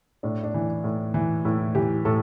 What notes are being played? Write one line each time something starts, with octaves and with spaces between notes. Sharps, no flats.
A2 D4
D4
E3
A2
E3
A2 E4
E3 G4
A2 A4